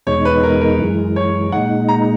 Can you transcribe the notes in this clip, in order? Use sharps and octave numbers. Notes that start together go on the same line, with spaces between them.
E2 B2 G#3 D#4 C#5
B4
A#4
A#4
F#2 E3 G#3
C#5
A#2 G#3 D#4 F#5
A#5